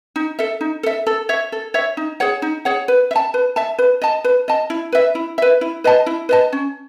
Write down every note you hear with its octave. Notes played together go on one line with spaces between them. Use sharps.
D#4
A4 E5
D#4
A4 E5
A4
C#5 E5
A4
C#5 E5
D#4
G#4 C#5 F#5
D#4
G#4 C#5 F#5
B4
E5
A5
B4
E5 A5
B4
D#5 A5
B4
D#5 A5
E4
B4 E5
E4
B4 E5
E4
B4 D#5 A5
E4
B4 D#5 A5
C#4